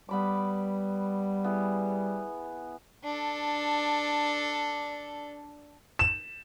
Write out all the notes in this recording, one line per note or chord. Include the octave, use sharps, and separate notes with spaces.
G3 B3 B5 D6
B3 E4 G#4
D4 A4
E7